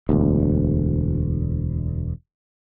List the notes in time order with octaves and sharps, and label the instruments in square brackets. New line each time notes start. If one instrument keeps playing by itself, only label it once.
[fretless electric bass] E1 D2